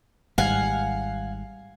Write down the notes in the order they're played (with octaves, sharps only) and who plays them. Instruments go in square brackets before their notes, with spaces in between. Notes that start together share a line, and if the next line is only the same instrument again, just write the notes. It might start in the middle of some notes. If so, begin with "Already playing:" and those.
[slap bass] G#1 G#2 G3 [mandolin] F5 F#5 G#5